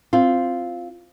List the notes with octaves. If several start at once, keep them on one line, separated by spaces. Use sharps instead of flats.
C4 F4